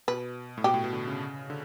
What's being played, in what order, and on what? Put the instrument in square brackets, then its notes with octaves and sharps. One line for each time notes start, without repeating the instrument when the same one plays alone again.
[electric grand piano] B2 [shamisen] B4
[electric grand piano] A2
[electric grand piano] B2 [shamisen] G4
[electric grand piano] A2
B2
D3
C#3
D3